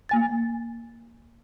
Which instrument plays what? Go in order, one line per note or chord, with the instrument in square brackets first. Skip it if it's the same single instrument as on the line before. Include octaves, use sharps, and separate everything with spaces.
[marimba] A#3 G#5 A6